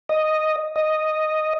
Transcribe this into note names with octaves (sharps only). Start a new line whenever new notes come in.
D#5
D#5